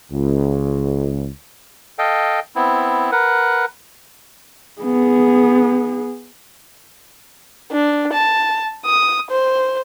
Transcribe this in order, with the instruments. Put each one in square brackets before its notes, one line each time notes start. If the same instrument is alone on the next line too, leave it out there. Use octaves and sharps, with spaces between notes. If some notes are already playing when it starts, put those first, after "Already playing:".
[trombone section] C#2
[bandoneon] A4 D#5 F5 G5
B3 C4 E4
A#4 B4 F#5
[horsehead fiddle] B3 G#4
[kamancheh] D4
A5
D#6
C5